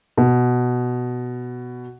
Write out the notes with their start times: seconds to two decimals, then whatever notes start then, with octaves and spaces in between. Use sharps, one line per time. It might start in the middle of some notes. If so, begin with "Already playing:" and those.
0.17 B2